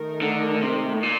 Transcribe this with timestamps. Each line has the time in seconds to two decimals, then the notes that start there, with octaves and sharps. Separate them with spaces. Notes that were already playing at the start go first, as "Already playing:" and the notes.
Already playing: D#3 A3 D#4 A#4
0.22 D3
0.62 C3
0.93 A2
1.03 A#2